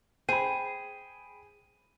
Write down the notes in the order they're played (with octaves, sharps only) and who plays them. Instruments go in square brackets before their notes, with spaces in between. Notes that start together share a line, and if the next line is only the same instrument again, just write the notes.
[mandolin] G#4 [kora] C5 [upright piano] G5 B5 [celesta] D#7